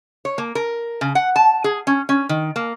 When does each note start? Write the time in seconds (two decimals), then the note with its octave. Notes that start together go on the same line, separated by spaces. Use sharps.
0.25 C#5
0.38 A#3
0.55 A#4
1.01 C#3
1.15 F#5
1.36 A5
1.64 G#4
1.87 C#4
2.09 C#4
2.29 D#3
2.56 A#3